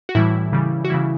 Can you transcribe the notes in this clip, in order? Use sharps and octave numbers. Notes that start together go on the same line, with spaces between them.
F#4
A2 E3 G3 E4
C#3 E3 G3
F#4
C#3 E3 G3 E4